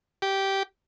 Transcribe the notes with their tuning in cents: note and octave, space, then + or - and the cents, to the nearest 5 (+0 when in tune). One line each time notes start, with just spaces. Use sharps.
G4 -10